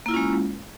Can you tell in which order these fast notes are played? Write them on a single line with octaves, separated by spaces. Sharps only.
A#3 E4 F4 C#4 G#3